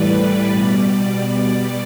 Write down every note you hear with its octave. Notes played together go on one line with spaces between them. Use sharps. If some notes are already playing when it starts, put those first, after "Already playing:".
Already playing: A2 E3 G3 B4 D5
D5
B2 G3 D5